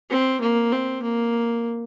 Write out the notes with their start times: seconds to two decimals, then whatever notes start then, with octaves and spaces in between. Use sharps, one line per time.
0.10 C4
0.41 A#3
0.72 C4
1.02 A#3